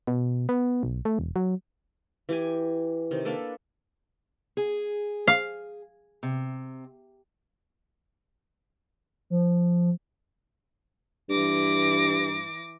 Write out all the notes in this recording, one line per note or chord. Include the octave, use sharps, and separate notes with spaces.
B2
B3
B1
A3
E1
F#3
E3 G4 G#5
C3 D#3
A#3 D4 A4 B4
G#4
F5
C3
F3
G2 E3 D6 A#6